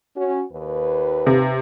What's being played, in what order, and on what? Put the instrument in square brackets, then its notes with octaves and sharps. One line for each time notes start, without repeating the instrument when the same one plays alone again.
[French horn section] C#4 F#4
D#2 B4
[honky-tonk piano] C3